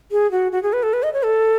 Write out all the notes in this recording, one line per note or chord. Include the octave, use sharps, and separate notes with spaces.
G#4
F#4
F#4
G#4
B4
A4
B4
D#5
C#5
A4